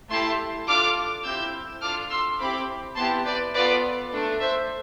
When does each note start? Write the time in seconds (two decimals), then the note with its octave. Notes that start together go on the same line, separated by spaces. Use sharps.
0.09 A3 E4 G4 A5 C6
0.67 D4 F4 A4 D6 F6
1.24 C4 E4 G4 E6 G6
1.82 D4 F4 A4 D6 F6
2.10 C6 E6
2.39 C4 E4 G4 B5 D6
2.97 B3 E4 G4 A5 C6
3.25 B4 D5
3.54 B3 F4 A4 B4 D5
4.11 A3 D4 A4
4.40 C5 E5